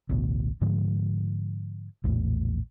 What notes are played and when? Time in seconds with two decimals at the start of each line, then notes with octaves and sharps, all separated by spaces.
0.09 A1 D2 B2
0.61 G#2 D3 F3 G#3
2.04 A#1 E2 A2